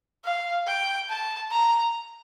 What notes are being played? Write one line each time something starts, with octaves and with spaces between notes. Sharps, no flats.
F5
G5
A5
A#5